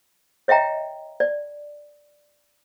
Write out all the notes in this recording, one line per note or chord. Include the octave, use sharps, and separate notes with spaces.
C#5 D#5 E5 G5 A#5
D5